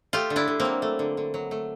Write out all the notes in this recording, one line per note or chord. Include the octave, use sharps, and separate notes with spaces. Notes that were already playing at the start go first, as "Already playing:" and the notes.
A3 F4 G4
D3
D4 E4
D3
A#3 C4
F#3
A3
D3
D3
F#3
A3